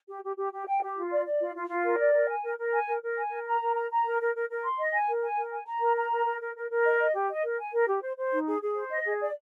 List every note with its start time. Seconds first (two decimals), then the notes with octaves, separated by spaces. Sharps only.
0.08 G4
0.23 G4
0.37 G4
0.52 G4
0.67 G5
0.82 G4
0.96 F4
1.11 D5
1.26 D5
1.40 F4
1.56 F4
1.70 F4
1.84 A#4
1.99 D5
2.14 A#4
2.29 G#5
2.43 A#4
2.57 A#4
2.73 G#5
2.87 A#4
3.02 A#4
3.17 G#5
3.31 A#4
3.47 A#5
3.61 A#4
3.76 A#5
3.90 A#5
4.05 A#4
4.20 A#4
4.35 A#4
4.49 A#4
4.64 C6
4.79 D#5
4.93 G#5
5.08 A#4
5.23 G#5
5.38 A#4
5.52 G#5
5.67 A#5
5.81 A#4
5.96 A#5
6.11 A#4
6.26 A#4
6.41 A#4
6.55 A#4
6.70 A#4
6.84 D#5
7.00 D#5
7.14 G4
7.29 D#5
7.43 A#4
7.58 G#5
7.73 A#4
7.87 G4
8.02 C5
8.17 C5
8.32 D#4
8.47 G#4
8.61 G#4
8.76 C5
8.90 D#5
9.06 G#4
9.20 D5